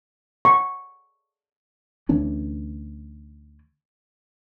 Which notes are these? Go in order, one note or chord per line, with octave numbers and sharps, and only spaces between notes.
C#6
D2 E3 C#4 D4